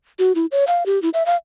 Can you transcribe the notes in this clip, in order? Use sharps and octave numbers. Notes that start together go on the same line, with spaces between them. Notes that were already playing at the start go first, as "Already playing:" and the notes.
F#4
E4
C#5
F5
G4
E4
E5
F5